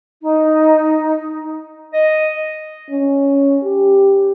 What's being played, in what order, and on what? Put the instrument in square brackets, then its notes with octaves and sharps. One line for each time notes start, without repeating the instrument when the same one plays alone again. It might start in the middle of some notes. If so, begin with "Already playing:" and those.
[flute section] D#4
[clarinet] D#5
[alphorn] C#4
G4